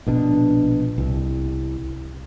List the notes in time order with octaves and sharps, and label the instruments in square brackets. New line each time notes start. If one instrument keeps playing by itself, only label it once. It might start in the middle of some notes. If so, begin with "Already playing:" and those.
[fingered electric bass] A#1 B2 D4
C2